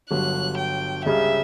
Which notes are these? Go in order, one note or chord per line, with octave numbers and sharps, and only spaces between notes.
G1 G2 F#3 F#6
G5
C#2 C#3 G3 E5